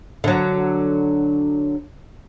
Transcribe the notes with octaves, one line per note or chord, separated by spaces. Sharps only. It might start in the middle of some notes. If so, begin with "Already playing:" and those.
D3 F#3